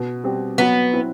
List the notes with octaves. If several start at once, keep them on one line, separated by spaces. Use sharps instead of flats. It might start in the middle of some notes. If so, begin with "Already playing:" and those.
Already playing: B2
G3 C4 G4
F#3 B3
C4 E4